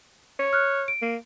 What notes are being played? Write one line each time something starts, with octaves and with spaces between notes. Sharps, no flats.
C#5
F6 F#6
D7
A#3